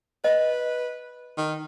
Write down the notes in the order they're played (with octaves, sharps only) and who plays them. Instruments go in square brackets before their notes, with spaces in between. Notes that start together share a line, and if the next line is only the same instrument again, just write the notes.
[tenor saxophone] B4 [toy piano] D#5
[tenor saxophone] D#3